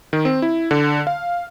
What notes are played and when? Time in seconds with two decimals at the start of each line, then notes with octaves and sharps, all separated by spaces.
0.13 D#3
0.25 C4
0.42 E4
0.71 D3
1.07 F5